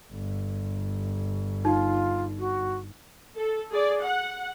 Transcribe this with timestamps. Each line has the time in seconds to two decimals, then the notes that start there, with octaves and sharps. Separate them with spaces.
0.12 G1
1.65 D#4 F4
2.39 F#4
3.36 A4
3.72 G#4 D5
4.03 F#5